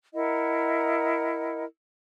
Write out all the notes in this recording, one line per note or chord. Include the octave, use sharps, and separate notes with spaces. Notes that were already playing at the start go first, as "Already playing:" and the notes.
E4 A#4 D#5 F#5